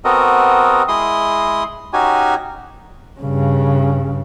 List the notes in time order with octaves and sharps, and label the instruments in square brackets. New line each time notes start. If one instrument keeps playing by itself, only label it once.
[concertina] B3 C4 F#4 A4 A#4 D#5
G#3 E4 C6 D#6
C#4 D#4 F#4 G4 G#5
[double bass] G2 C#3